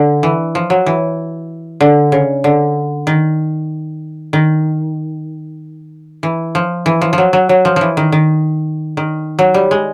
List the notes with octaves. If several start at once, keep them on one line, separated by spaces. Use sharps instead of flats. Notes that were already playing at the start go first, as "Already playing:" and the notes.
Already playing: D3
E3
F3
F#3
E3
D3
C#3
D3
D#3
D#3
E3
F3
E3
F3
F3
F#3
F#3
F#3
F3
E3 F3
D#3
D#3
D#3
F#3
G3
G#3